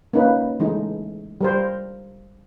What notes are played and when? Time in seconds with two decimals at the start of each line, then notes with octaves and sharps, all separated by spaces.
0.13 A#3 C#4 D#4 B4
0.60 E3 G#3 A3 D#4 E4
1.41 G3 A#4 C5